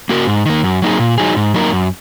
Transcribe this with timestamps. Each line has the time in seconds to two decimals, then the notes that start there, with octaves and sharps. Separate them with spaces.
0.09 A#3 F#4 A#4
0.27 G#2
0.46 D#3 A#3
0.64 F#2
0.82 F#3 A#3 D#4 G#4
0.99 A#2
1.18 F#3 D#4 G#4
1.36 G#2
1.54 F#3 A#3 D#4 A#4
1.72 F#2